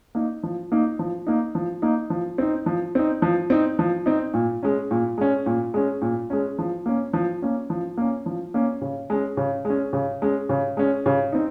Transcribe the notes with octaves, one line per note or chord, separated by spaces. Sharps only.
A#3 D#4
F3
A#3 D#4
F3
A#3 D#4
F3
A#3 D#4
F3
C4 D#4
F3
C4 D#4
F3
C4 D#4
F3
C4 D#4
A#2
G#3 C#4
A#2
G#3 C#4
A#2
G#3 C#4
A#2
G#3 C#4
F3
A#3 C#4
F3
A#3 C#4
F3
A#3 C#4
F3
A#3 C#4
C#3
G#3 C#4
C#3
G#3 C#4
C#3
G#3 C#4
C#3
G#3 C#4
C#3
C4 D#4